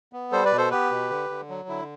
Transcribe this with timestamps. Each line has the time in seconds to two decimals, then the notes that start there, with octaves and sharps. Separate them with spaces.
0.13 B3
0.32 G3 A4 C5
0.45 B4 D5
0.52 B2
0.58 A4 C5
0.71 B3 G4 B4
0.91 B2
1.10 D3
1.30 D3
1.49 F#3
1.68 D3 E4